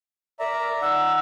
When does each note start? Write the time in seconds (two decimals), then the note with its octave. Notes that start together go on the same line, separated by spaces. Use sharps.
0.40 A#4 D5 E5 A#5
0.82 D#4 F#5 E6